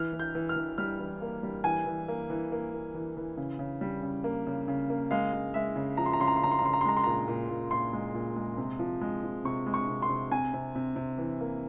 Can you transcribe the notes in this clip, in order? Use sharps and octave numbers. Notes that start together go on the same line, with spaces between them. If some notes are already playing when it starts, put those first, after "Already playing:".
Already playing: E3 F6
E3
G6
E3
F6
E3
G3 F6
E3
A#3
G3
E3 G#5
E3
A#3
E3
A#3
A#3
E3
E3
C#3
C#3
G3
C#3
A#3
C#3
C#3
A#3
G#3 F5
G#3
G#3 E5
C#3
F3 A#5
C6
A#5
C#3 C6
A#5
C6
C#3 A#5
C6
A#5
C#3 C6
A#5
C6
G#3 A#5
C6
A#2 A#5
A#2
A#2
A#2 C6
G#3
A#2
G#3
C3
F3
G#3
F3
C3 C#6
G#3
C#6
C3
C6
C3
C3 G#5
C3
C3
C3
E3
A#3